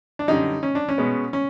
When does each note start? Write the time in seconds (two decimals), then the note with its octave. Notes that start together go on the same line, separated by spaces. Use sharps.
0.19 D4
0.28 F#2 D3 G3 D#4
0.63 C#4
0.75 D4
0.89 C#4
0.98 B2 G#3 B3
1.33 C#4